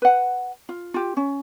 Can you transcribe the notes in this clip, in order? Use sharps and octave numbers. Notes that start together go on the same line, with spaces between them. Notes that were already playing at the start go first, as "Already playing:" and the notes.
B4 F#5
F4
F4 G4
C#4